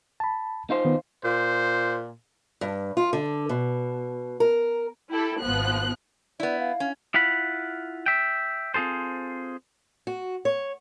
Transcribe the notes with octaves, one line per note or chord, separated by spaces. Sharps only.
A5 B5
D#4 F4 C5
D#3 B3
A#2 C5
G2
F4
D3
B2
A#4
E4 G4 A4
G#1 F3 B3 F#6
B3 E4 D5
F5
C#4
E4 F4 F#5 B5
E5 G5
C4 F4 G#4 A4 C5
F#4
C#5